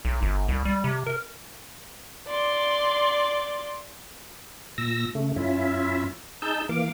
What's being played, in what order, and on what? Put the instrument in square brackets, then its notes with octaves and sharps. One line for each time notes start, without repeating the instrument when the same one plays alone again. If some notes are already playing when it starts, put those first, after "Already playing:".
[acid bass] B1
G1
C2
G3
C3
A#4
[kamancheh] D5 C6
[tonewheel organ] A#2 E6 A#6
C#3 A3
F#2 C#4 E4 F4 E5
D#4 G#4 A5 E6 G6
E3 A#3 F5 D6